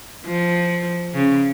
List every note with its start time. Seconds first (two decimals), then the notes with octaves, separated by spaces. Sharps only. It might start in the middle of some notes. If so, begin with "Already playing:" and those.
0.25 F3
1.15 C#3